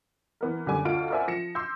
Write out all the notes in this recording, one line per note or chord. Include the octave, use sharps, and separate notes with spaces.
E3 B3 A#4
F#1 D3 G3 G#5 D6
D2 F4 D#5 D7
A#4 C5 D5 E5 F#5 G#5
F3 A#6 C#7 E7
C6 D6 E6 G6